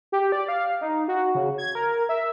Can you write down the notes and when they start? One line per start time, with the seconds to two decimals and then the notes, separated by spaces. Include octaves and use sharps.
0.12 G4
0.32 D5
0.48 F5
0.81 D#4
1.08 F#4
1.35 C#3
1.58 G#6
1.75 A#4
2.09 E5